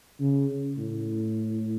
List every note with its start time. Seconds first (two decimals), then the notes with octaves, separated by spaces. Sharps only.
0.20 C#3
0.78 A2